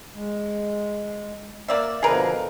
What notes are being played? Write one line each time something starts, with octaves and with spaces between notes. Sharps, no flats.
G#3
A#3 D5 E5
B2 D3 F3 G#4 A#4 B4